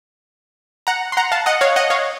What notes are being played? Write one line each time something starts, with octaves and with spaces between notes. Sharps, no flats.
F#5 A#5
C6
F#5 A#5
F5 A5
D#5 F#5
C#5 F5
D#5 F#5
C#5 F5